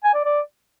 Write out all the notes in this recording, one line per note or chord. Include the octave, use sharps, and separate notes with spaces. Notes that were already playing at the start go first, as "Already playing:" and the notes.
G#5
D5
D5